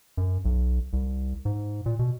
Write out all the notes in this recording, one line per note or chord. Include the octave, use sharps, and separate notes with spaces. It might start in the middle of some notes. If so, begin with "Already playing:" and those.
F#2
B1
C2
G#2
A#2
B2